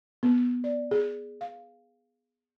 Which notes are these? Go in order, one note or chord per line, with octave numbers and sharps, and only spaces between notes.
B3
D5
G#4
F5